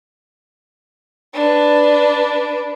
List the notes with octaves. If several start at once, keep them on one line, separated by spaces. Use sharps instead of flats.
D4 B4